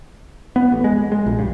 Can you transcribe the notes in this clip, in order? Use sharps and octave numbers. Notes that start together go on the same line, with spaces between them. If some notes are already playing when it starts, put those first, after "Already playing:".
B3
A1
G#3
G#3
A#1
G2